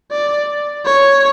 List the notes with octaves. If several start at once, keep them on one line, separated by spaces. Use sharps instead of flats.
D5
C#5